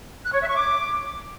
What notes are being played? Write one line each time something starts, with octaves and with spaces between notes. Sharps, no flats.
F#6
C#5
E5
C#6
D6